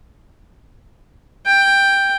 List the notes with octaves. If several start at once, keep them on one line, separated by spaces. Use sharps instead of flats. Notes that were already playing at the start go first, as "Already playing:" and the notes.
G5